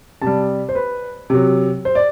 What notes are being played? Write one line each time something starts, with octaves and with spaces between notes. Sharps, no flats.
C3 G3 A5
C5
B4
C3 F#3
C5
D5